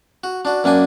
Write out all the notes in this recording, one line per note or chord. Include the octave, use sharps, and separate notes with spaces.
F#4
D4 F#4
F#2 A#3 D4 G#5